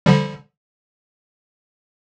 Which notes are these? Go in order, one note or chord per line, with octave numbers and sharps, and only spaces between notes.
D3 F3 G3